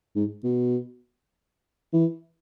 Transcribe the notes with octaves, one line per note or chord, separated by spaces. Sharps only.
G#2
B2
E3